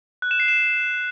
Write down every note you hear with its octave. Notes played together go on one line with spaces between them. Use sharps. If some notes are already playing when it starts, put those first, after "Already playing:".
F#6
E7
C7
E7